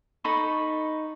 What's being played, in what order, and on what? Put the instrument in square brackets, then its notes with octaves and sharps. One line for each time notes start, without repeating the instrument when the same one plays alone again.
[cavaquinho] D#4 A4 B5 C#6